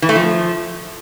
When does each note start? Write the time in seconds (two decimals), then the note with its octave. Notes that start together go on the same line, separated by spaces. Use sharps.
0.02 E3
0.09 A3
0.15 F3